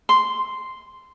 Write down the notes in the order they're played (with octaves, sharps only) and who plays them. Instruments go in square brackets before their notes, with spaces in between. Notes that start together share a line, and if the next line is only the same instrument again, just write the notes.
[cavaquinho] C6